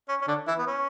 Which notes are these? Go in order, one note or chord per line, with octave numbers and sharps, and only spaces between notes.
C#4
C#4
D3 D4
E3 E4
B3
C#4